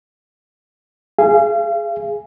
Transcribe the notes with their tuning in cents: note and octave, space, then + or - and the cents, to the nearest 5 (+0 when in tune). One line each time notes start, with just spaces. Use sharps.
G#4 +0 F5 -35